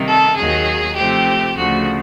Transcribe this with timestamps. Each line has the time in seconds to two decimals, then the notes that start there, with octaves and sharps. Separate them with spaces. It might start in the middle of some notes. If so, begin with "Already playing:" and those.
Already playing: C3 D#3 G3 A#3
0.08 A4
0.37 D#2 D#3 F#3 A#3 G#4
0.96 C3 F3 A3 C4 G4
1.56 D2 C#3 F3 A3 F#4